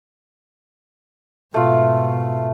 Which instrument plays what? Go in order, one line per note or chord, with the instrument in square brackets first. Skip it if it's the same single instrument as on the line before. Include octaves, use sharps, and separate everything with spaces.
[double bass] G#2 B2 [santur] A3 F4